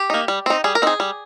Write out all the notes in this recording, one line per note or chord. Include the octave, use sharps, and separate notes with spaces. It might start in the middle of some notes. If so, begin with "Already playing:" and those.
Already playing: G4
A#3 D#4
G3
C4 D#4
G3 G#4
A#4
C4 D#4 G#4
G3